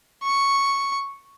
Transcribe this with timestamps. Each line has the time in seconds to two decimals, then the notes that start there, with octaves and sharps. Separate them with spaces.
0.23 C#6